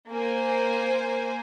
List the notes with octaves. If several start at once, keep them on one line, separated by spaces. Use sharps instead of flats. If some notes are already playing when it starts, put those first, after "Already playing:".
A#3 C5 G#5